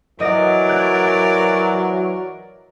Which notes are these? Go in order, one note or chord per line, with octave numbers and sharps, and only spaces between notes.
E3 F#3 A#4 D5 D#5 A#6
F#6 G#6 A6